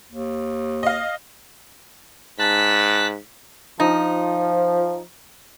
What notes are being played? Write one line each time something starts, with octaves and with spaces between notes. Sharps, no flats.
D#2
D#5 F5
G#2 A5 F#6 B6
F3 D#4